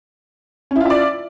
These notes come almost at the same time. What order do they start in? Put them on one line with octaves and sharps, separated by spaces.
C#4 E4 F4 E5 D5